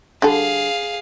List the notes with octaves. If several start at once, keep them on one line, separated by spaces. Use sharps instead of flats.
D3 G3 G#4 A4 F5